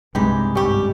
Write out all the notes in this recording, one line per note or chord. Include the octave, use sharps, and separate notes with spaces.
C2 G2 C3 E3 G#3 D#4 G4
G1 G#2 G3 C#4 G4 C#6